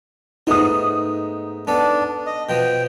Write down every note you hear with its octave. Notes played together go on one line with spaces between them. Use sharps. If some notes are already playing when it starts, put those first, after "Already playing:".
G#2 A3 B3 D#4 D#6
B3 D4 A4
D#5
B2 F3 B3 G5